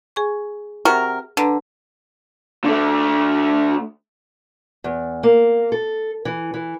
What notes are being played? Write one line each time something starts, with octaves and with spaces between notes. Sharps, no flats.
G#4 G#5 C#6
C3 F#4 A#4
D3 D4 B4 A#5
D3 A3
E2
A#3
A4
E3
E3